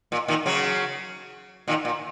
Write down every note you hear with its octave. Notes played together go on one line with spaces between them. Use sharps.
A#2
A#2 D#3
C#3 F#3
A#2 D#3
A#2